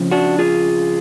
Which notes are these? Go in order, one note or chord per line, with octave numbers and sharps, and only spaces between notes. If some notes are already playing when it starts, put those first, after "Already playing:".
Already playing: F2 C#3 F3
D4 F#4
F4 G#4